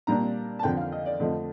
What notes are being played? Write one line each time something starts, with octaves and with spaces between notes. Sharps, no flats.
A#2 G3 A#3 D4 A#5
A5
F2 D3 F3 G5
F5
D#5
D5
F2 D3 F3 A3 D#5